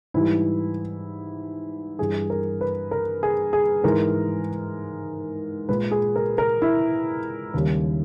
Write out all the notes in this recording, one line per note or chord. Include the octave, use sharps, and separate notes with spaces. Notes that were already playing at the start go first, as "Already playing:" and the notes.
G#2 E3 G3 E4
G2 E3 G3 G#4
A#4
B4
A#4
G#4
G#4
G#2 E3 G#3 A#4
A#2 G#3 B4
G#4
A#4
A#4
E4
D#2 C#3 G3